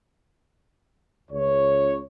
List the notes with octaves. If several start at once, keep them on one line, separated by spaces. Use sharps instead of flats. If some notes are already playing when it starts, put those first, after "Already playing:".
C#2 C#5